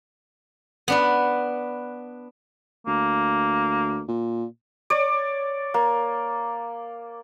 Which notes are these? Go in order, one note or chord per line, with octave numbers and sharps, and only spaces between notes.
B3 D4 B4
D2 A#3
A#2
C#5 D5
A#3